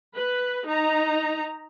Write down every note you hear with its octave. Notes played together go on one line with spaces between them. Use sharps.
B4
D#4 A#5